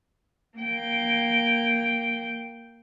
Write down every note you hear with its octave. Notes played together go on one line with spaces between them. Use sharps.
A#3 G5